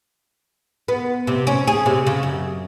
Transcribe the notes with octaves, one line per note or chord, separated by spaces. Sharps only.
B3
C3
C#4
G#4
C3
C#3
F#2